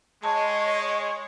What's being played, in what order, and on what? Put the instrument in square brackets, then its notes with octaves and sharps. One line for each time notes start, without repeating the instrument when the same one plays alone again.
[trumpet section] G#3 [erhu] C#5 [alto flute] D#5 [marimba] A5